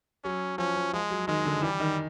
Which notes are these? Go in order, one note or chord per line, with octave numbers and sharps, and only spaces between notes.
F#3 C#4
F3 C#4
F3
F3 G#3
F#3
D#3 G#3
D3
E3 G3
D#3